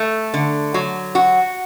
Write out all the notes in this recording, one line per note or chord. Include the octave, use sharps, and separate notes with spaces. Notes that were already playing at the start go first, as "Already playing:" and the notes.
Already playing: A3
D3
F#3
F#4